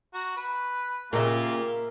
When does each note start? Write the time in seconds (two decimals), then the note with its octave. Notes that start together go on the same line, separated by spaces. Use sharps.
0.14 F#4 A#5
0.37 B4
1.13 A#2 C#3 A#3 F4 G4 A#4 E5